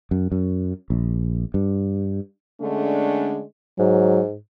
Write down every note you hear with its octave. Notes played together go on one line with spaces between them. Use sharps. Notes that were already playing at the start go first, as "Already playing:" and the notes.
F#2
F#2
A#1
G2
D3 G#3 A3 C#4 D4
G#2 F#3